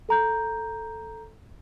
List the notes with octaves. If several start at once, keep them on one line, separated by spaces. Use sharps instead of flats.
A4 A#5 G6